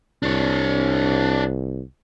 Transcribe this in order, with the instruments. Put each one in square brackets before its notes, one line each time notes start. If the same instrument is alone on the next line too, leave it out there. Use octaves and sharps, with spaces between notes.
[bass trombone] C2 [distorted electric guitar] D4 C#5